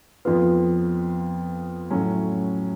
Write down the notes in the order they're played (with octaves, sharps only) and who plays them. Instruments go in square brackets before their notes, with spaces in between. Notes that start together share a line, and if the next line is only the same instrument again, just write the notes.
[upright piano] F2 F3 B3 F4 B4
A2 F#3 C#4